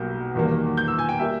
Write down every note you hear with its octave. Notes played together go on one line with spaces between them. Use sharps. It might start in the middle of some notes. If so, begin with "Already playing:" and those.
Already playing: B1 B2 G3 A#3 G6
E2 D#3 G3 A#3
G6
E6
G#5
G5
G3 A#3 E5